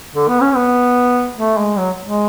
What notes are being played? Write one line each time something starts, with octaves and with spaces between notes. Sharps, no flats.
D3
B3
C#4
B3
A3
G#3
F#3
G#3